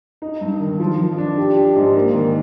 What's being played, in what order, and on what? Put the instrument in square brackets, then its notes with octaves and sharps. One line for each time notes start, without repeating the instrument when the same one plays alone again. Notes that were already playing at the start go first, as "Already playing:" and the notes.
[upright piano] D#4
G2
D#3
F3
F3
D4
G4
G4
G#2
A#3
D#3